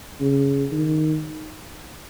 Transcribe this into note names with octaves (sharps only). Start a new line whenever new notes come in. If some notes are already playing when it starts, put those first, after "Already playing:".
C#3
D#3